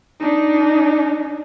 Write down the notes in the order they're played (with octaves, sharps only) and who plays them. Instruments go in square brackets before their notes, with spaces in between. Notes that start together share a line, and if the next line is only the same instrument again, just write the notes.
[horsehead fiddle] D4 D#4